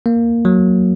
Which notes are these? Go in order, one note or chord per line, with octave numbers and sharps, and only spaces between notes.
A#3
F#3